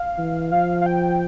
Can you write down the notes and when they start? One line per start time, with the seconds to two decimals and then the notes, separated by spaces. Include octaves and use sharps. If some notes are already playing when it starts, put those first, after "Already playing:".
Already playing: F5
0.18 E3
0.51 F3 F5
0.81 F5
0.86 G5